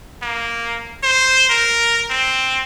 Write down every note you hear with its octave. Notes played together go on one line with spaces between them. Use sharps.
A#3
C5
A#4
C4